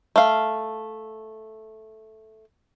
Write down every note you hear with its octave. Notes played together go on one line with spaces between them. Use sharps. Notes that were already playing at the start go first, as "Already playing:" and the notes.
A3 F5